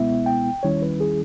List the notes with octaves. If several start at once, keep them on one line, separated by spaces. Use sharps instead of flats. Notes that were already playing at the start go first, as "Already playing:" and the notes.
Already playing: C#2 B2 G#3 B3 E4 E5
G5
D#2 D#3 G3 C#4 E4 C#5
B4
G#4